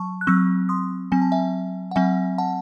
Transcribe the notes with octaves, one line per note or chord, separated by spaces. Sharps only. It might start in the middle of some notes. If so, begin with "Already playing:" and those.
Already playing: F#3 A5 C#6
F#6
F#3 C4 C#6 E6
C6 D#6
F#3 C4 G#5
A5
E5 G#5
F#5
F#3 C4 E5 G#5
F#5 A5